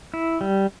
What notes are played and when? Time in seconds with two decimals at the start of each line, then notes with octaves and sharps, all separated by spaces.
0.14 E4
0.41 G3